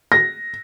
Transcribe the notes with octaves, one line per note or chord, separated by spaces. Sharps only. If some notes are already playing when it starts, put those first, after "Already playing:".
A#6